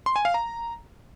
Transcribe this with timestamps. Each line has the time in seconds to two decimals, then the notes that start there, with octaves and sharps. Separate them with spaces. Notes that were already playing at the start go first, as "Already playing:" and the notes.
0.06 C6
0.16 G#5
0.25 F5
0.34 A#5